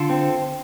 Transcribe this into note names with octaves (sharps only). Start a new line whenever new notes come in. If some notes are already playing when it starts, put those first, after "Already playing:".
Already playing: D3 F4 A4
C4